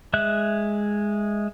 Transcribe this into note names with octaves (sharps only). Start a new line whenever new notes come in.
G#3 E5 F#6